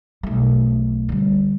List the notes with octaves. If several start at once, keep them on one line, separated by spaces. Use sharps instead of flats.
B1 A3
D3 G3